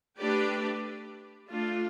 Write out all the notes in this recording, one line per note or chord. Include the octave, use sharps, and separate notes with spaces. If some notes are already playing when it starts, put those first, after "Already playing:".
A3 D4 G4 B4 D5
A3 D4 F4